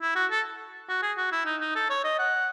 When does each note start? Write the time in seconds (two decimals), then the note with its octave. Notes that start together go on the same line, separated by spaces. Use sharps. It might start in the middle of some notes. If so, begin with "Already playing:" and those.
0.01 E4
0.15 F#4
0.31 A4
0.89 F#4
1.02 G#4
1.17 F#4
1.32 E4
1.46 D#4
1.61 D#4
1.76 A4
1.90 C#5
2.04 D#5
2.19 F#5